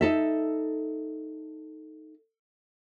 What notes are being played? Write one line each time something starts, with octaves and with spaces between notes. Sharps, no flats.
D#4 A4 E5